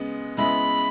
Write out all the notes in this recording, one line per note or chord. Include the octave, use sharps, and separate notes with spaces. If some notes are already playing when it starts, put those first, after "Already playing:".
Already playing: C#3 G#3 B3
C#3 G#3 B3 E4 B5